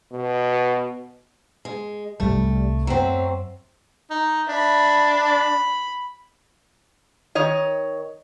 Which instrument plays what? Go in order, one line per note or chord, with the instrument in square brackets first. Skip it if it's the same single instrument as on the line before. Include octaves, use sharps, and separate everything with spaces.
[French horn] B2
[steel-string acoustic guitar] G#3
[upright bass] C2 A2 [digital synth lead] G3 [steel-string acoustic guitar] A3
[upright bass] F#2 [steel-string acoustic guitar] F#3 C4 [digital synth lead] E5
[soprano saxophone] D#4
[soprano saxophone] D4 [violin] E5 B5
[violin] B5
[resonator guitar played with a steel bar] D#3 C#5 D#5